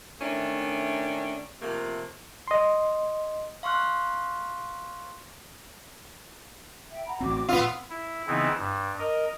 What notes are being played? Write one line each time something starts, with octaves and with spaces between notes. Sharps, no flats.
D#3 A3 C#4 D4 E4
C3 F3 A3 A#3
D#5 C6
F5 C6 C#6 F6 F#6
E5 G5
F#5 A#5 B5
A1 C4 F#4 D6
A#2 B3 C4 F4 D#6 E6
E4
C#3 E3 B3 C4 D#4 E4
G2
A#4 D#5